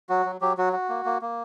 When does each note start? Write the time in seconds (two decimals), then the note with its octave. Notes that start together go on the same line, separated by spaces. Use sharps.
0.09 F#3 F#4
0.26 F#3
0.41 F#3 G4
0.58 F#3 F#4
0.73 F#4
0.89 A#3
1.05 A#3
1.22 A#3